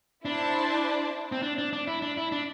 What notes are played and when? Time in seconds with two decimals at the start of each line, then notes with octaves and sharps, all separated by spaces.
0.25 D4 E4 C5 A5
1.32 C4
1.43 D4
1.58 D4
1.73 D4
1.87 E4
2.02 D4
2.17 E4
2.32 D4